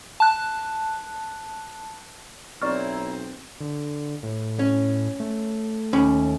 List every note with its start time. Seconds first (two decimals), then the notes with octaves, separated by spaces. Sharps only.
0.20 A5 F#6
2.62 B1 C4 E4 C#5 D5 A#5 C#6 F6
3.60 D3
4.23 A2
4.59 C#4
5.20 A3
5.93 D#2 C#4 B5